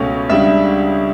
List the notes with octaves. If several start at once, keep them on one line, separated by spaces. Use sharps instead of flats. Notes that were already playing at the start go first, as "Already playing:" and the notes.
Already playing: C#2 B2 A3 C#4
C#2 C#3 G3 D4 E5